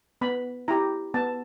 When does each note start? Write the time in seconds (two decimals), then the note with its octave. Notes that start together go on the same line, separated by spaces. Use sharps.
0.21 B3 B5
0.68 E4 G4 A#5
1.14 B3 A5